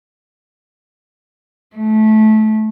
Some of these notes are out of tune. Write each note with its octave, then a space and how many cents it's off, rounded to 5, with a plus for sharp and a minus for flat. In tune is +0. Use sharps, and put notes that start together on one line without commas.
A3 -20